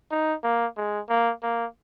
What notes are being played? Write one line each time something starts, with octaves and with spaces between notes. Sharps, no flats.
D#4
A#3
G#3
A#3
A#3